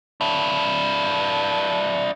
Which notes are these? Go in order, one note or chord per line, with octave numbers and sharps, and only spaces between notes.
D4 E4